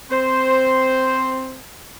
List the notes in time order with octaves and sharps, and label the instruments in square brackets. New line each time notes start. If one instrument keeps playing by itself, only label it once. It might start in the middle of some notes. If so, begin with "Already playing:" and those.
[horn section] C4 C5